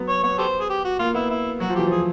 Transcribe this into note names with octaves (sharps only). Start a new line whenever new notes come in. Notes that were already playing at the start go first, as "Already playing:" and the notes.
Already playing: F#3 B3
C#5
B3 C#5
G4 A4 C5
G#4
G4
F#4
A#3 F4
B3 E4
E4
F#3 F#4
F3
E3 G4
F3 G#4